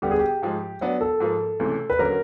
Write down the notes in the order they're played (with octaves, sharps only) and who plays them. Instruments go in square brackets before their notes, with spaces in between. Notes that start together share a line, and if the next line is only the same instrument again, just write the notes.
[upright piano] D3 G3 B3 [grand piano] G4
[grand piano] G#4
G4
[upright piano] G#2 F3 G#3
F#3 B3 D4
[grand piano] A4
[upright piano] G#2 F3 A#3
C#2 C3 E3 A3
[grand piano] B4
[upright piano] D3 F#3 A#3 C#4 [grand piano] A#4